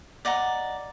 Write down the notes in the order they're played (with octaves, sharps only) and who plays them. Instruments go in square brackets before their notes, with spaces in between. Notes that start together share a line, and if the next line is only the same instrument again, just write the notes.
[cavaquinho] D5 D#5 F#5 A#5